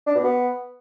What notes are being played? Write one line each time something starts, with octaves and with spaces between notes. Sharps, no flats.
D4
B2
B3